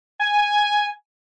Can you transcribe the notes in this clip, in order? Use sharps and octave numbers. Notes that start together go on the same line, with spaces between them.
G#5